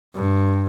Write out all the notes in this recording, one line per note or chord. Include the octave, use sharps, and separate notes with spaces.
G2